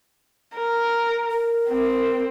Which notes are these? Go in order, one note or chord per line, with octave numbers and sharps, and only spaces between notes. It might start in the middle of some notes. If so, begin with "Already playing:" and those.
A#4
A#4
C4